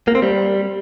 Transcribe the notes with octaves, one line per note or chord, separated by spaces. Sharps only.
A#3
C4
G3